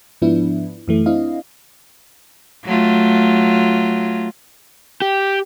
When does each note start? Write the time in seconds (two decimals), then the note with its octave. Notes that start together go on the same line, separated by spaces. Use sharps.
0.22 G#2 F3 B3 D4 E4
0.88 F#2 E3 A3
1.06 C4 D4 E4 D#5 F5
2.65 F#3 A3 F4
5.02 G4